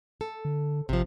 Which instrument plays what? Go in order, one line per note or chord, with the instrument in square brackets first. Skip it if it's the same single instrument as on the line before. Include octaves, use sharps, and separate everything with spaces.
[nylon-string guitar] A4
[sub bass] D3
[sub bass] A1 [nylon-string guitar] C3 F3